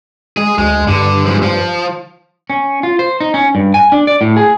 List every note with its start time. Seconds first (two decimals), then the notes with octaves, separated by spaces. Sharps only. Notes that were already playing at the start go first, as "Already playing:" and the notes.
0.37 G#3 G#4
0.58 D2 G#3
0.88 G2 D3
1.25 G#2 F3
1.43 F3
2.50 C#4
2.83 F4
2.99 C5
3.21 D#4
3.34 C#4
3.55 G2
3.74 G#5
3.92 D4
4.07 D5
4.21 A2
4.36 G#4